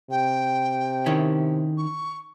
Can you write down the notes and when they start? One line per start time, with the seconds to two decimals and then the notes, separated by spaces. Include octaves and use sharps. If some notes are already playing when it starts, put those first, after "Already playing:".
0.10 C3 G5
1.06 D#3 C#4 E4
1.77 C#6